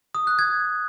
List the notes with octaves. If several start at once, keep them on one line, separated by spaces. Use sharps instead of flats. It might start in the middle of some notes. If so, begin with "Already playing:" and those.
D#6
F#6
G#6